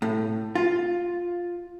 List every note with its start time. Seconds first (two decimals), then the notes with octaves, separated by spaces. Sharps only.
0.02 A2
0.55 F4